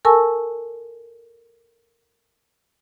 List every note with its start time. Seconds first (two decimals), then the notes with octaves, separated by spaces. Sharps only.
0.05 A4 A#4 G#5 A5 C#6 E6